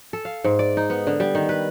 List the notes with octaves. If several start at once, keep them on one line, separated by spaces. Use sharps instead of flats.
A4
F5
G#2
D5
D#4
B3
D3
G3
D#3
B4